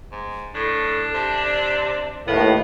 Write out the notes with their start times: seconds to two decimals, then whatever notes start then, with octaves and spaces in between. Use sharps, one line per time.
0.12 G#2
0.55 A2 D4 A4
1.14 C3 A5
1.45 D5
2.27 D#2 A2 B3 A#4 F5